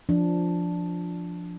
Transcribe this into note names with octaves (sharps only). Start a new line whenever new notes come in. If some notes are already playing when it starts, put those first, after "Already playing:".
F3 D4